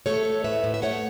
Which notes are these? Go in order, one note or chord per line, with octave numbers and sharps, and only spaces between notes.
A3 A4 C#5
A3
A2 B4 E5
A2
E5
A3 C#5 F#5